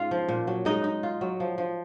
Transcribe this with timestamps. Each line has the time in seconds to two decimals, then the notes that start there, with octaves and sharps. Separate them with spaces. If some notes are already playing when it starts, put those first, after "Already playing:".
Already playing: G#2 C#4 D#4 F4 F5
0.11 F3
0.28 A#2
0.47 F#3
0.65 G#3 D#4 D#5
0.84 D#4
1.03 F4
1.21 F#3
1.40 F3
1.58 F3